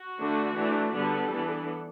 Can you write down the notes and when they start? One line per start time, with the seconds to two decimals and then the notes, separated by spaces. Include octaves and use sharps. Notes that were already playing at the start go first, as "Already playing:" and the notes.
Already playing: F#4
0.19 D3 A3 D4
0.56 E3 A3 D4
0.94 D3 G3 B3 D4 A4
1.32 E3 B3 D4